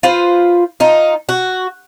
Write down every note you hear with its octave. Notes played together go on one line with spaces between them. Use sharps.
F4 B4 C5
D#4 F4
F#4